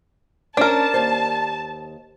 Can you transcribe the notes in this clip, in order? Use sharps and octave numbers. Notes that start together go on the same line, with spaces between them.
C#4 D4 A#4 C5 D5 A5
D#2 G4 C5